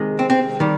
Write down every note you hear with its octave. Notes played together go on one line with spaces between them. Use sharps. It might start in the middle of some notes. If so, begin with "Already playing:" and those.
Already playing: C3 D#3 G#3
C4
C4
D#3 G3